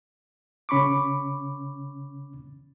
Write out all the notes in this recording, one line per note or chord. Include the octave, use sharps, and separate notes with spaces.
C#3 C#4 B5 C#6 D6